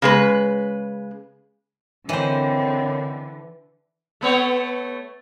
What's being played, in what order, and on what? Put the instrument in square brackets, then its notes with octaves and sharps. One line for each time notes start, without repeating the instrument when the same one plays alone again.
[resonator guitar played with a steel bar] C#3 G#3 B4
[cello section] D3 [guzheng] E3 C5 [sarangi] C4 [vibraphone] A#4 C#5 D#5
[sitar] A3 B3 C#5